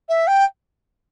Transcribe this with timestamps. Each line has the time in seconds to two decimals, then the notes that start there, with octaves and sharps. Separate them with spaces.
0.09 E5
0.27 G5